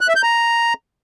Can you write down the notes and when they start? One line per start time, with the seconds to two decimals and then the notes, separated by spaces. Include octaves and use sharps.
0.01 F#6
0.08 E5
0.16 G6
0.23 A#5